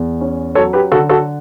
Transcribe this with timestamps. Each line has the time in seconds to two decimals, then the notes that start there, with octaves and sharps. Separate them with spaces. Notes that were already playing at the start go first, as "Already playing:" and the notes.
Already playing: E2
0.21 C#4
0.55 F#3 A4 C#5
0.73 G4 B4
0.92 D3 F#4 A4
1.09 F#4 A4